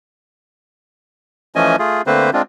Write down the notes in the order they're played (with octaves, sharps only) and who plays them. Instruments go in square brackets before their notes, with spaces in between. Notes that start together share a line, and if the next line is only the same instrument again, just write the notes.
[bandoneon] E3 F3 A3 C#4 D#5 G#5
A3 F4 G#4
D3 A3 A#3 C4 B4 C5
G#3 C4 D4 F4